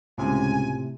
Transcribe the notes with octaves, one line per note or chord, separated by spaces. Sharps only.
C#2 A2 C3 G#5